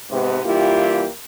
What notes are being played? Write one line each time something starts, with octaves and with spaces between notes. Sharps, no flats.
G#2 C3 B3
E3 G3 A#3 E4 F4 G4